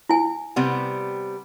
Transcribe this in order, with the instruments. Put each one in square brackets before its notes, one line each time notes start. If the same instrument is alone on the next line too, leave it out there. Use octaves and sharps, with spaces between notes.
[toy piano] E4 G#5
[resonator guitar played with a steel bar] C3 G3 B3